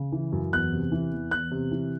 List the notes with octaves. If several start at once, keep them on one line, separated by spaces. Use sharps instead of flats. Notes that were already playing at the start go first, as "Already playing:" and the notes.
Already playing: C#3
E3
F#2
E2 F#6
C3
E3
E2
E2 F#6
C3
E3